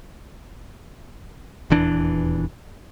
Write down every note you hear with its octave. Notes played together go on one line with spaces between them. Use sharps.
D#1 E2 E3 D4